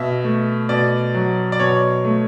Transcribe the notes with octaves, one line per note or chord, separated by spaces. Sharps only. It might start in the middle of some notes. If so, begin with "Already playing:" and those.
Already playing: B2 E5
A3
B2 D5
F#3
D5
B2 C#5
A3